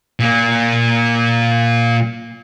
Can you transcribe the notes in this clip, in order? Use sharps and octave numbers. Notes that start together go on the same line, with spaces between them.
A#2 A#3